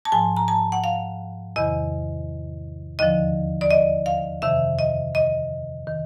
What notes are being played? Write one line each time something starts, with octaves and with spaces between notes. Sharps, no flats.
A5
G#2 F3 G#5
A#5
A5
F#5
F5
E2 C3 D#3 D#5
D#2 D3 F3 D#5
D5
D#5
F5
F2 C3 D#3 E5
D#5
D#5
D#3